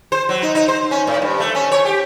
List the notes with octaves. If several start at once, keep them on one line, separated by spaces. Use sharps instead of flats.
C5
F#3
D#4
D#4
C5
C#4
A2
G2
A3
C#4
C#5
G4